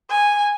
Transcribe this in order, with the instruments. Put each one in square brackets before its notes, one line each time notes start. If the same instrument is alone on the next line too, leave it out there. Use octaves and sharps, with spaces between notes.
[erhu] G#5